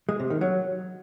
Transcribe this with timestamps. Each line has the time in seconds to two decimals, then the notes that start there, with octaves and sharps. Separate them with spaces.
0.09 G#3
0.19 C3
0.30 D#3
0.41 F#3